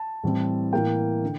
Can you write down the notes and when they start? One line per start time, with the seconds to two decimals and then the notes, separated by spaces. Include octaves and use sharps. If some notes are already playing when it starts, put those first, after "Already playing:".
Already playing: A5
0.24 A2 E3 G3 C4
0.73 A2 E3 A#3 G5
1.23 D3